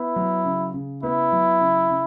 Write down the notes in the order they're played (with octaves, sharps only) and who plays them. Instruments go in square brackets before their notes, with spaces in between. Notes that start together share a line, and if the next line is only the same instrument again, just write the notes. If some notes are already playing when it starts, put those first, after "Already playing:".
Already playing: [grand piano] B3 [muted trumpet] E4
[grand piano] F#3
C#3
C#3
[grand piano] B3 [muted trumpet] E4
[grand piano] F#3
C#3
C#3